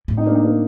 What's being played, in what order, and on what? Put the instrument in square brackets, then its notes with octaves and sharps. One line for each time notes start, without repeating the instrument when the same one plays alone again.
[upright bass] A2
[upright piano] C4 D#4
A#3 D4
C4 D#4
A#3 D4